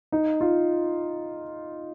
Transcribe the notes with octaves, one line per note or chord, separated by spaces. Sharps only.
D#4
F4